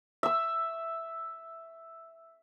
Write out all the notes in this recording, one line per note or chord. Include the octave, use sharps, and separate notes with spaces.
E5 E6